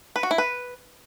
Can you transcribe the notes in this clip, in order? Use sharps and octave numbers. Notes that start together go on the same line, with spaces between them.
B4
F#4
E4
B4